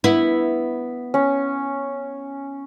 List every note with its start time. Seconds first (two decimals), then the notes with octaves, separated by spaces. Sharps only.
0.04 B3 E4
1.14 C#4